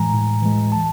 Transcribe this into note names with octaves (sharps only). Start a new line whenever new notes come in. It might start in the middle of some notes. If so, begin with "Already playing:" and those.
Already playing: A2 E3 G#3 G#5 A#5
A2
E3 G#3
A5